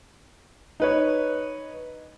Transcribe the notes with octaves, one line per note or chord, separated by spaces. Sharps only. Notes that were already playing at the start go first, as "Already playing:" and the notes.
D#4 B4 C#5